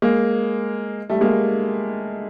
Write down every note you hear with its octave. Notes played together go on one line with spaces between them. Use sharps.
G#3 A#3
G3 A3
G#3 A#3